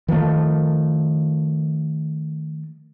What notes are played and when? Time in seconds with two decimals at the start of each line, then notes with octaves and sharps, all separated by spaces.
0.08 D#3 F3 G3 A3